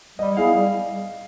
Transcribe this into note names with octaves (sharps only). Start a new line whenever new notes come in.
G3 D#5
B3 E4 G#4 F5
G3